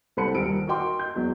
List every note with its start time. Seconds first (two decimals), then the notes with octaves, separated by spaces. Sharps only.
0.17 C2 A4 C5 B5 F#6 C#7
0.35 D#1 G3 A#4 E6 D7
0.67 F#4 A#4 D#5 G5 C6 D6
0.99 G6
1.15 E2 F#3 G#3